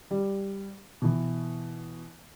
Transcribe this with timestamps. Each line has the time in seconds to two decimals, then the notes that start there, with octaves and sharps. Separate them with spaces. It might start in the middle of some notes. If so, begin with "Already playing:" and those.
0.11 G3
1.02 B2 E3